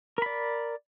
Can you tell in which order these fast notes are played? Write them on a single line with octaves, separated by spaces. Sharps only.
A#4 B5 D5